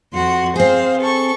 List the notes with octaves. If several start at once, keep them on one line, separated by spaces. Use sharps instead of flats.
F2 F#4 C6
C4 G#4 C5 F5
A4 C#6